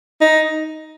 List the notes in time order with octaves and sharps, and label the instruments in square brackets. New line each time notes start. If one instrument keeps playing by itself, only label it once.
[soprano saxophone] D#4